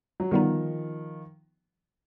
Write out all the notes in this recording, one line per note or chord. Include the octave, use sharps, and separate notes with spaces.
F#3
D3 D#3 F3 G3 B3 D#4